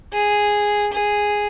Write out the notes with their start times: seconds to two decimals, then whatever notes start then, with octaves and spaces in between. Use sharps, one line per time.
0.13 G#4
0.93 G#4